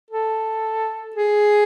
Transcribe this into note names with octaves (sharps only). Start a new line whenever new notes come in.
A4
G#4